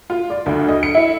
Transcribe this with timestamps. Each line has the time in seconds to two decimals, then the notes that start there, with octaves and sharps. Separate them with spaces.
0.10 F4
0.30 D5
0.46 D2
0.68 D#5
0.83 C#7
0.95 E4